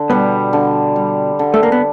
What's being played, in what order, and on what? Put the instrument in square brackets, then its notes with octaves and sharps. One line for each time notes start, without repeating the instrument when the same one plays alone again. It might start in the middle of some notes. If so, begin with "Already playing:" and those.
Already playing: [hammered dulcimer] D3
[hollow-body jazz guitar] B2 B3 [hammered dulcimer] G3
[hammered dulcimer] D3
G3
D3
[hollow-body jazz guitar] A3
A#3
B3